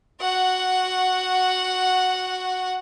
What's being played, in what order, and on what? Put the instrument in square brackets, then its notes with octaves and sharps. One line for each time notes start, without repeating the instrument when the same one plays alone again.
[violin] F#4 F#5